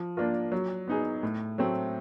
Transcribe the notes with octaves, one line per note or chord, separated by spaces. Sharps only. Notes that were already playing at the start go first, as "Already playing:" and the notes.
Already playing: F3
A#3 D4 F4 A#4
F#3
B3 D#4 G#4
A2
F#3 A3 C4